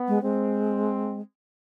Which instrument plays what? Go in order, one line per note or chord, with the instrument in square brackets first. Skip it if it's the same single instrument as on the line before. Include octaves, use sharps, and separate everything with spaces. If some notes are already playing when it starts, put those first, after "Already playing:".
Already playing: [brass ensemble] B3
[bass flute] G#3
[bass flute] G#3 [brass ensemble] C4